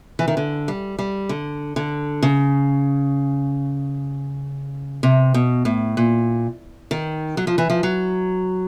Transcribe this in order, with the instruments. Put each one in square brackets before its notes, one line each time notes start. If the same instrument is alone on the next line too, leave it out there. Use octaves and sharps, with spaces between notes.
[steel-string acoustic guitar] E3
D#3
D3
G3
G3
D3
D3
C#3
C3
B2
A2
A#2
D#3
F#3
F3
E3
F3
F#3